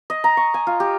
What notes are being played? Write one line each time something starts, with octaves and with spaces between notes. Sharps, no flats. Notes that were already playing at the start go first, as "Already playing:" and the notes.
D#5
A#5
C#6
G#5
F4
G4